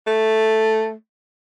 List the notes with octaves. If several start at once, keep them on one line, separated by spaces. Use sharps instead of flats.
A3